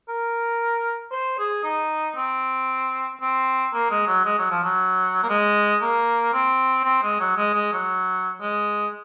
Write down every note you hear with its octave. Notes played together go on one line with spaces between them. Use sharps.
A#4
C5
G#4
D#4
C4
C4
A#3
G#3
F#3
G#3
F#3
F3
F#3
A#3
G#3
A#3
C4
C4
G#3
F#3
G#3
G#3
F#3
G#3